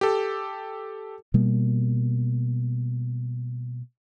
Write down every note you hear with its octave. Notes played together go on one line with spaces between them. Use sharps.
G4 A4
B2 G3 A#3